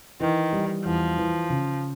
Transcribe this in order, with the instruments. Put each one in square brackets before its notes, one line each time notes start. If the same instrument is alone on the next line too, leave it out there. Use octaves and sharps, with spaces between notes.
[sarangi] D#3 [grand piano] E3
[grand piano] G3
[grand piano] E2 [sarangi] F3
[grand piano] E3
C#3